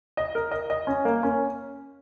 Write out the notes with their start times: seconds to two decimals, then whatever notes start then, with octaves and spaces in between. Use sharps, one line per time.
0.17 D#5
0.35 A#4
0.51 D#5
0.70 D#5
0.87 C#4
1.05 A#3
1.23 C#4